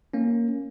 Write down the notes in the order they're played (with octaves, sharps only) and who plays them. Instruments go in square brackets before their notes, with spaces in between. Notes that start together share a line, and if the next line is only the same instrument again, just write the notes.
[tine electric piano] A#3 C#4